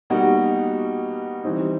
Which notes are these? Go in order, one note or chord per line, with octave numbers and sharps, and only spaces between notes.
B2 G3 A#3 D#4 F#4
E3 G3 C4 D#4